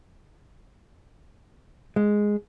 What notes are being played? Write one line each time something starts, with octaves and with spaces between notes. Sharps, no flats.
G#3